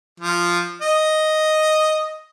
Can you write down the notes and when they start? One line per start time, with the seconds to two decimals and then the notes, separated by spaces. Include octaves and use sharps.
0.20 F3
0.81 D#5